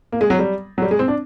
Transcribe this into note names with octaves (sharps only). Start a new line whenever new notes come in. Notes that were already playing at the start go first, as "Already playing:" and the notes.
A#3
G#3
F#3
G3
F#3
G3
G#3
C4
D4